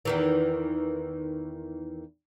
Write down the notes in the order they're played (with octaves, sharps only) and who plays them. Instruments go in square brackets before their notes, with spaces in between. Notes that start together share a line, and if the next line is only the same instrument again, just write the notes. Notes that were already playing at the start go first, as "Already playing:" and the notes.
[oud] E2 D#3 E3